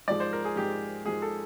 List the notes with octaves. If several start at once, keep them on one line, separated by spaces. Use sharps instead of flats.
G#2 F3 G#3 D5
C5
A#4
G#4
G#2 F3 G#3 G4
G#2 F3 G#3 G#4
A4